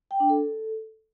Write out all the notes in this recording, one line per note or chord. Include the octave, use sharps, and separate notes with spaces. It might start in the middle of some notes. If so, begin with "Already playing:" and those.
G5
D4
A4